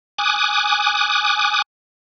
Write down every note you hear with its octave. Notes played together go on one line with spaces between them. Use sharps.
G#5 D6 D#6 F#6